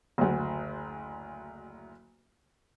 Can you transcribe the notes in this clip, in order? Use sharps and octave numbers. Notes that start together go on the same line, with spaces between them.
F#1 D2